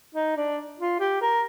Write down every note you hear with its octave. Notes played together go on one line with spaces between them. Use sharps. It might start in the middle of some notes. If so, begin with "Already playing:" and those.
D#4
D4
F4
G4
A#4